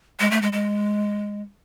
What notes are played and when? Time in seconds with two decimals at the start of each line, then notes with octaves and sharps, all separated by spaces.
0.20 G#3
0.31 A3
0.42 G#3
0.53 G#3